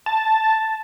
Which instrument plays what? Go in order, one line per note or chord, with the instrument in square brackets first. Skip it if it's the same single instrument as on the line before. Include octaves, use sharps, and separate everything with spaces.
[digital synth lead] A5